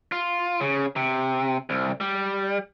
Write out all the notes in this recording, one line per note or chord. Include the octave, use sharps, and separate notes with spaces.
F4
C#3
C3
C2
G3